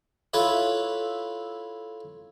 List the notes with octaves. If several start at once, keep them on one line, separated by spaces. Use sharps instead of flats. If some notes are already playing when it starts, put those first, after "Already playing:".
E4 F4 A4 B4 C#5 E5